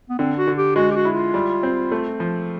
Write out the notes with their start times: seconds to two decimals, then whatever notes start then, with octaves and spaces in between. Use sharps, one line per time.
0.10 B3
0.19 D3 C4
0.38 F#4
0.47 D3
0.58 G4
0.76 G#3 F#4
0.91 G4
0.96 F#4
1.05 E4
1.14 F4
1.34 G3
1.63 C4
1.92 A3
2.20 F3